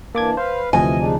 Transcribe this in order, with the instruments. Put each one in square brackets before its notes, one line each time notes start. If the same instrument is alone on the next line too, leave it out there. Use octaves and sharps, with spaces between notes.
[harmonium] E3 D4 [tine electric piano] A#3 D6 G#6
[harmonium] B4 F5 [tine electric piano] C5
[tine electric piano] D2 C3 F3 [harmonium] E3 D#5 [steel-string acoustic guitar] G#5
[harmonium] C#3 D4 D#4